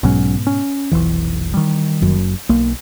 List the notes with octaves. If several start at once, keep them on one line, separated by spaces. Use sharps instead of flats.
B1 G#2 B2 F#3 C#4
C#4
F1 B1 E3
D#3 G3
F#1 F#2
B1 A#3